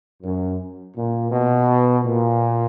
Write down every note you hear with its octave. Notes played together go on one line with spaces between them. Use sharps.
F#2
A#2
B2
A#2